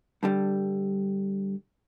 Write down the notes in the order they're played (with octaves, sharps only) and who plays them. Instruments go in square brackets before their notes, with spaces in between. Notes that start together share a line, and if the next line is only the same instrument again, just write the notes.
[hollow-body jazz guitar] G2 D3 G3